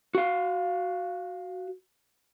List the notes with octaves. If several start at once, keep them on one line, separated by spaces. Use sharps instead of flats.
F#4 F5